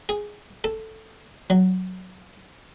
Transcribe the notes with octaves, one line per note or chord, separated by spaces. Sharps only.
G#4
A4
F#3